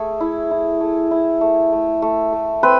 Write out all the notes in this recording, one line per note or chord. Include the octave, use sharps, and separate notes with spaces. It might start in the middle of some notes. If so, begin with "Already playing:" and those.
Already playing: A3 G#4
E4
E4
A3
E4
A3
A3
A3
A3
C4 B4